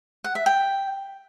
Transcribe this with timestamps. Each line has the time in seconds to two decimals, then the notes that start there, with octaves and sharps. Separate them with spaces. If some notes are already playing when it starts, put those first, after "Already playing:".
0.24 F#5
0.35 E5
0.46 G5